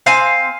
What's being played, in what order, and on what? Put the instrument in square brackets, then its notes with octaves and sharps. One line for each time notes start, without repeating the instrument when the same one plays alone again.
[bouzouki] C4 F5 G#5